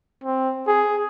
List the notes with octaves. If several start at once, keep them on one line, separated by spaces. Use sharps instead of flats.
C4
G#4